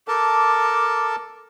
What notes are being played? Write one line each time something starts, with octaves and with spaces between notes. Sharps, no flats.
A4 A#4 A5 D6